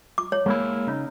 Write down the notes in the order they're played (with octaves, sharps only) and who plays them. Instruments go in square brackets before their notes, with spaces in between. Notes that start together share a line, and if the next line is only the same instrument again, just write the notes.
[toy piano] D6
C#5
[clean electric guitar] G#3 A#3 E4
C#3 D#4